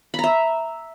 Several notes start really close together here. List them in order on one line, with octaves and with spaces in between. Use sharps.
B5 A#5 E5